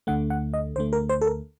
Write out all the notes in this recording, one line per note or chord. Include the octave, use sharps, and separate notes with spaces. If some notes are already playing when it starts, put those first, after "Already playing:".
D2 D3 A3 F#5
F#5
D#5
D2 D3 A3 C5
A#4
C5
A4
A#4